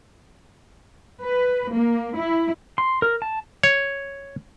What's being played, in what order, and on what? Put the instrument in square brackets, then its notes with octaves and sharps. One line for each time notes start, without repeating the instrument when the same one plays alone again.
[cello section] B4
A#3
E4
[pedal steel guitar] C6
A#4
A5
[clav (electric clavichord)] C#5